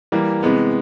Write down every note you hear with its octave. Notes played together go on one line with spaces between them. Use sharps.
E3 G3 A#3
C3 E3 G#3 B3